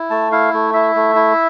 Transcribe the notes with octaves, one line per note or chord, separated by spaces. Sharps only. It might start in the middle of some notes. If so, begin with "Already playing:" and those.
Already playing: E4
A3 A5
E4 F5
A3
E4 E5
A3
E4